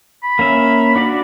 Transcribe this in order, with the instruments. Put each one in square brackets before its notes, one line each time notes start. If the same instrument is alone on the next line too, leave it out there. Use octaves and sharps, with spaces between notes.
[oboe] B5
[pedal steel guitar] A#3 C#4 E5
D4 F#4 D5